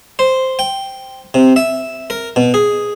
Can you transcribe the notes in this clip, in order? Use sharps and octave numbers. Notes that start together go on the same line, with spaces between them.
C5
G5
C3
E5
A#4
B2
G#4